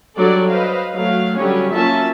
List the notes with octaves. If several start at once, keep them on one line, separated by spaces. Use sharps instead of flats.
F#3 G3 D4 A4 D5
B4 C5 D#5 F5
F#3 A3 F5
D3 F#3 G3 C#4 G4 C#5
F#3 A#3 C#4 F4 E5 A5